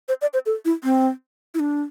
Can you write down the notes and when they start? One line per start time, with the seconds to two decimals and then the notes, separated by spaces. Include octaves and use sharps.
0.08 C5
0.22 D5
0.34 C5
0.46 A4
0.65 E4
0.84 C4
1.54 E4
1.59 D4